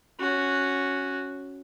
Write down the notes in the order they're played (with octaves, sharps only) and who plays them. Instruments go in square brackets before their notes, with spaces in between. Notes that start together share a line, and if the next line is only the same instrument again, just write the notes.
[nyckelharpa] C#4 F#4